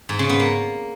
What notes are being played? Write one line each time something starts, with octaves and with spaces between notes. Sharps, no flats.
G#2
C#3
B3
A#3